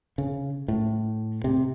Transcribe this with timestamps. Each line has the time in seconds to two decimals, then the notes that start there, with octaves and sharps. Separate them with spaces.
0.18 C#3
0.68 A2
1.44 C3